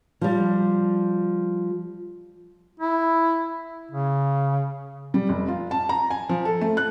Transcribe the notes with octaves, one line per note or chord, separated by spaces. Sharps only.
F3 G3
E4
C#3
G3
F1
F4
A5
A#5
G#5
F3
A4
A3
F#6